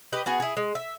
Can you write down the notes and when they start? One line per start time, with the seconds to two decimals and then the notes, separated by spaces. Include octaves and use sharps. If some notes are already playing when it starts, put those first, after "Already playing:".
0.12 G4 B4 D#5
0.26 B3 F#4 G#4
0.40 E4 G#4
0.57 G#3
0.75 E5